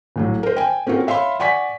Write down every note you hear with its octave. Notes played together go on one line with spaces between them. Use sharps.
A#1 A2 F#3
A#4 C5
G5 G#5
C4 C#4 F4 F#4 A4 A#4
C#5 E5 F5 B5 C6
D5 F#5 G#5 C#6 B6